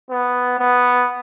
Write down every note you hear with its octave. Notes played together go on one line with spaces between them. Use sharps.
B3
B3